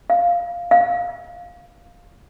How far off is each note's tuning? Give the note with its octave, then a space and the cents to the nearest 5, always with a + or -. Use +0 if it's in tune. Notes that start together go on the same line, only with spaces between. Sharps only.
F5 -5
F5 +5